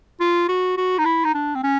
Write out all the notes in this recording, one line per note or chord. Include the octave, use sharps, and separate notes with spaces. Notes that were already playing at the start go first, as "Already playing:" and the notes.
F4
F#4
F#4
D#4
E4
D#4
D4
C4
C#4